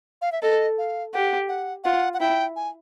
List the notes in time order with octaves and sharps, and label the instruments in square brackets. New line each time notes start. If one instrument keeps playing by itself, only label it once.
[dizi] F5
E5
[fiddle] A4 [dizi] D#5
[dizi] F5
[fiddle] G4 [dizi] F#5
[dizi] F#5
[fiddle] F4 [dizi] F#5
[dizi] F#5
[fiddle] E4 [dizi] G5
[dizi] G#5